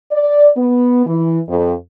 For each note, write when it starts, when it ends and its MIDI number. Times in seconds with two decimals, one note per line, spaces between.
0.12 0.48 74
0.57 1.03 59
1.05 1.39 52
1.48 1.73 41